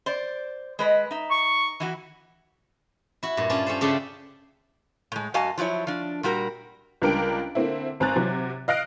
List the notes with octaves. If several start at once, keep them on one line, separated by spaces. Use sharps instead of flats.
C5 D5
G#3 B4 D#5
D#4 E5
C#6
E3 E4 F#4
E4 F#4
G2 A#2
C#4 D4 F4 A5
C#4 A4 C5
C#3 D4 G4 A4 E5 C6
A2 G#3
F#2 F#4 D#5 F5 G#5 A5
F3 F#3 G#3 E4 C#5
F3 D4
A#2 G3 F#4 A#4
C#2 G3 D4 A#4 G5 D7
D3 A#3 C4 E4
G#1 C4 G#5 A#5 F#6 A6
C3 F#3
D#5 F5 F#6 A#6 D7